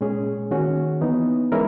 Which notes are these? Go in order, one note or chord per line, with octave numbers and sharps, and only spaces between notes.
A#2 G#3 C#4 G#4
D#3 A#3 C#4 F#4
E3 B3 D#4
E3 G#3 C#4 E4 A#4